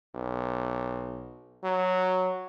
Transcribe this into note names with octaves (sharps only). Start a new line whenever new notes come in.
B1
F#3